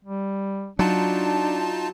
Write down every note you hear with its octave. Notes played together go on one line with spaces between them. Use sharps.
G3
F#3 D4 D#4 F4 A5